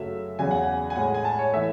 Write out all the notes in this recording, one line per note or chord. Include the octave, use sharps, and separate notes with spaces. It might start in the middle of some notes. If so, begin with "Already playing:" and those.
Already playing: F#2 C#3 F#3 A3 E5
E2 C#3 F#3 G#5
F#5
G#5
G#5
A2 G#3 F#5
G#5
A5
C#5
E3 A3 E5